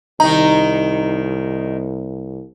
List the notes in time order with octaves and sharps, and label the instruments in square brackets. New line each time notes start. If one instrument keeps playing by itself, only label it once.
[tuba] C2 [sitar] D#3 D#4 [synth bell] A#5